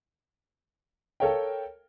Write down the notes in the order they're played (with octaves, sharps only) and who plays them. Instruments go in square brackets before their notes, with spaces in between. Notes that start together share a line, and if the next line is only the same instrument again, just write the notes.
[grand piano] A4 A#4 C#5 F5 G5